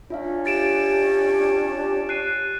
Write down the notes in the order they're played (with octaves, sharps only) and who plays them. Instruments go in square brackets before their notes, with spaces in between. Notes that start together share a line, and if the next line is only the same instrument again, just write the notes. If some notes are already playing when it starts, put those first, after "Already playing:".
[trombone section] C#4 D4 [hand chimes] F4 E5 F5
[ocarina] G4 [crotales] A6 D7 E7
[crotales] F#6 C7 D#7